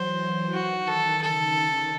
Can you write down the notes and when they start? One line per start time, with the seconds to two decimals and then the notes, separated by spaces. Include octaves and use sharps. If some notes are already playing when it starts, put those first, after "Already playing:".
Already playing: E3 F#3 C5
0.53 D#3 F#4
0.87 A4
1.21 C#3 A4